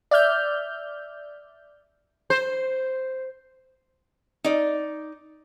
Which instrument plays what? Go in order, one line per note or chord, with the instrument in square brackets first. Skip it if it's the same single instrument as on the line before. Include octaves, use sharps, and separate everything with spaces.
[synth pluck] D5 E5 F6 G6
[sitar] C5
[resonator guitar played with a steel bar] D#4 D5